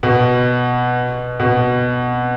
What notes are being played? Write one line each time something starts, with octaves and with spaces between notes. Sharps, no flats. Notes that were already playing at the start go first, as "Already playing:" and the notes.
B2
B2